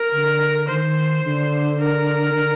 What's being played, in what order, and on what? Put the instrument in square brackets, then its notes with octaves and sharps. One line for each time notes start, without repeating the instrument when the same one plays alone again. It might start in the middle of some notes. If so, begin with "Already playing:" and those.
Already playing: [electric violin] A#4
[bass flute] D3
[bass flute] D#3 [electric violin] C5
[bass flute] D3
[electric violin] A#4
[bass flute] D3